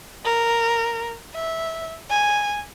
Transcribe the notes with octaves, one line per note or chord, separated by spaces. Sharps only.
A#4
E5
G#5